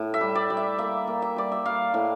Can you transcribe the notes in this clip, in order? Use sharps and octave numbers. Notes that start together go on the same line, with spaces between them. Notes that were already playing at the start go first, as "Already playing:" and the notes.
Already playing: A2
E5
G3
D5
G3
E5
A#3 E5
A#3
E5
G3 D5
E5
G3 F5
A2